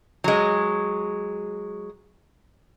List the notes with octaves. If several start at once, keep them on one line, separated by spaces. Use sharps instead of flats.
F#3 G#3